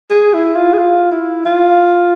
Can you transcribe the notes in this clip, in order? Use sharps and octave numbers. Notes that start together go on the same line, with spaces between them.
G#4
E4
F4
G#4
F4
E4
F4